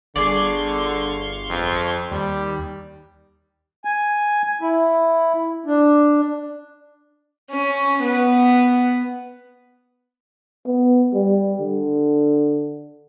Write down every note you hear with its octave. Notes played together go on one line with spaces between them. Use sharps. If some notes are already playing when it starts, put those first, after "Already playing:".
G1 D3 G#4 D5 F5 C6 C#6
F2
D#2 G3
G#5
E4
D4
C#4
B3
B3
G3
D3